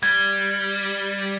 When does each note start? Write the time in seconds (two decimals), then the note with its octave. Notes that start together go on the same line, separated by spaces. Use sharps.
0.03 G3 G#6